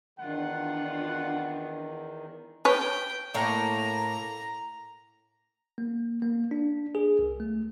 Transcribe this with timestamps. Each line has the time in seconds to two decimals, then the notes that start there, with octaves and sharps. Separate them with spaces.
0.19 E2 D#3 D4 F4 F#5
2.65 B4 C#5 G5
3.34 A2 A#3 A#5
5.78 A#3
6.22 A#3
6.51 D4
6.95 G#4
7.19 C2
7.40 A3